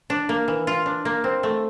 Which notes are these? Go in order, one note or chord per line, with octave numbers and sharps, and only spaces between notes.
D4
A#3
E3
F4
D4
A#3
C4
A3